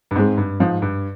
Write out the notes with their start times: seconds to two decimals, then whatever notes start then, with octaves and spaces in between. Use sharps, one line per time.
0.11 G2
0.15 G#2 G#3 C4
0.37 G2
0.60 G#2 F3
0.82 G2